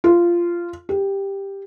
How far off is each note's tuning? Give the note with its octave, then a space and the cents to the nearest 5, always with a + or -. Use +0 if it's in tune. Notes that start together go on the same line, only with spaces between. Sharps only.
F4 -15
G4 +5